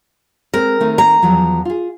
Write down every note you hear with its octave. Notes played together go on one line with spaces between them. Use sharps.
G#3 C4 A#4
D#3 A3 C4
A#5
E2 F3 F#3
F4 G#4